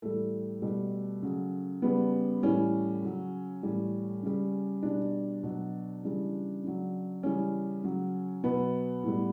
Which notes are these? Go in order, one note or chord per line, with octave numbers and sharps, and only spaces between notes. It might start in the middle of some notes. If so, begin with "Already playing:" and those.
A2 E3 G3 A3
B2 G3
C#3 F#3
C#3 G3 B3
A2 E3 G3 C#4
C#3 F#3
A2 E3 G3
C#3 G3
B2 G3 D4
B2 F#3
C#3 E3 G3
C#3 F#3
C#3 E3 G3 C#4
C#3 F#3
B2 F#3 B3
A2 G3